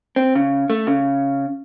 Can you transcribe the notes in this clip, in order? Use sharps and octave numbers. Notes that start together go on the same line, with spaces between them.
C4
C#3
A3
C#3